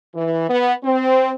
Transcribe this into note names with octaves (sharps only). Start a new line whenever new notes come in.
E3
B3
C4